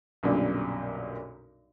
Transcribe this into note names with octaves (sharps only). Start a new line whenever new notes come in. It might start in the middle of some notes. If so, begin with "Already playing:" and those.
B1 F#2 A#2 D3 G3